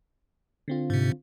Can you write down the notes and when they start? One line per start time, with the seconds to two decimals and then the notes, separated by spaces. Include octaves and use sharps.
0.68 D3 C4 F4
0.90 G#2 C3